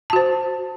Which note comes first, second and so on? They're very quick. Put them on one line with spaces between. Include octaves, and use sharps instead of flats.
A5 F#4 C5